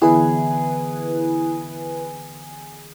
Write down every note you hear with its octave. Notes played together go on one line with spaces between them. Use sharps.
D3 E3 B3 E4 G#4 B4